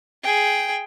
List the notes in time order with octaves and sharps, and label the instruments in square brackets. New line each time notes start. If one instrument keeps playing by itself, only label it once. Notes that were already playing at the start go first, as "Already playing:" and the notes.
[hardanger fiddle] G#4 G5